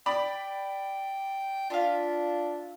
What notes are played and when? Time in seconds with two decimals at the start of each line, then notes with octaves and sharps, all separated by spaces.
0.06 D5 G5 B5
1.70 D4 F4 E5 F5